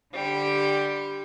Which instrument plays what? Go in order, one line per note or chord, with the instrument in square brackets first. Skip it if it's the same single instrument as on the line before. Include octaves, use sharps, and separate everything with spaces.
[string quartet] D3 G3 G4